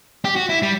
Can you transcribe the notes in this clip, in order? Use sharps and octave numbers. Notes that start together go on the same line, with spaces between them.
G4
F#4
E4
G3